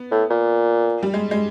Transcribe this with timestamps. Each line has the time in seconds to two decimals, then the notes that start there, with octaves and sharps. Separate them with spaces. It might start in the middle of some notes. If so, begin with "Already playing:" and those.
Already playing: B3
0.11 A2
0.30 A#2
1.03 G3
1.14 G#3
1.31 G#3